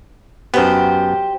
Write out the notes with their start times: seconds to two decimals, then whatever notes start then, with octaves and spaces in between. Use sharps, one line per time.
0.54 F#2 B3 G4 C5